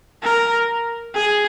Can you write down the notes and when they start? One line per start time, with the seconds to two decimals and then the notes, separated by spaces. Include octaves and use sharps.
0.23 A#4
1.14 G#4